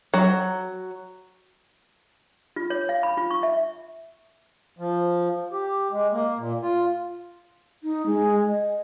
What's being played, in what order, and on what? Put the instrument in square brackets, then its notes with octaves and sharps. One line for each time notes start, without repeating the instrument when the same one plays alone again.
[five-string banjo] F#3
[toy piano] F4
C#5
F5
B5
F4
C#6
E5
[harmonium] F3
G4
G#3
A#3
A#2
F4
[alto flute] D#4
G#3
D#5